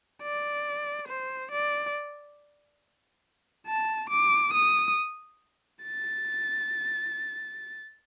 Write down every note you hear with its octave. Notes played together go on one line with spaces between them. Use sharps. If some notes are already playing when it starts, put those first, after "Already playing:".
D5
C5
D5
A5
D6
D#6
A6